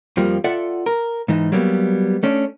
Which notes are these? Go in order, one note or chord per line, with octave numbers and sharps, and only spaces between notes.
F2 F3 G3 A#3
F4 A4 D5 E5 F#5
A#4
G#2 E3 D#4
F#3 G3 A#3 B3
A3 C#4 D4